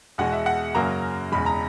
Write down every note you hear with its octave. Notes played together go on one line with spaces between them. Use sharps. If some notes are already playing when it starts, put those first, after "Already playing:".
E2 B2 G#3 F#5
E5
F#5
F#2 C#3 F#3 A#3 A#5
E1 E2 C#3 G#3 B5
A#5